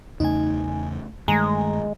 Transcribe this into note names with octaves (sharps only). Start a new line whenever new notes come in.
E2 C#3 A3 D#4 G#5
G2 D#3 G#3 A3 G#5 A#5